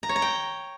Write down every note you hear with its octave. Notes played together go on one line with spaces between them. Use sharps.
A#5
C#5
A#5
G5